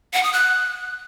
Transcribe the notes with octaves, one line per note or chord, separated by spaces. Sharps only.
F#5
D#6
F#6